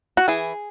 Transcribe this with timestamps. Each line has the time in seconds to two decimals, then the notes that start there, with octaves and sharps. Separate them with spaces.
0.17 F#4
0.28 E3 G#4